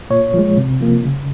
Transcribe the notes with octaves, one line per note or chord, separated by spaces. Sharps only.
A#2 C#5
F3 G#3
C3
F3 A#3
C#3